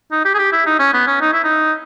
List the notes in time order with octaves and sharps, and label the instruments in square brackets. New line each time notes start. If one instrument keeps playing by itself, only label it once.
[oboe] D#4
G4
G#4
G4
E4
D#4
C#4
B3
C#4
D#4
E4
D#4